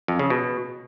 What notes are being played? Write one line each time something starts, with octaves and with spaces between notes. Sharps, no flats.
F2
C#3
B2